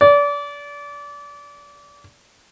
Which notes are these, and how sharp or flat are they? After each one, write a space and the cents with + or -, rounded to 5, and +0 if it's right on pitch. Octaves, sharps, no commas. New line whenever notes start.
D5 -30